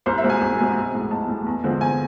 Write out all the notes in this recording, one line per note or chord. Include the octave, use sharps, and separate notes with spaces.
C2 C5
E5
B2 G#3 C4
G#5
C2
B2 G#3 C4
B1
A2 G#3
B1 A5
A2 G#3
E2
D3 F3 G#3 C4
E2 G#5